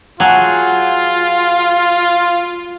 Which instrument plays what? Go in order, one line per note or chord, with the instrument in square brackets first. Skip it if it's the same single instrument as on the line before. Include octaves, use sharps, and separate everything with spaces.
[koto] F#3 F#4 G#4 [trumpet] F4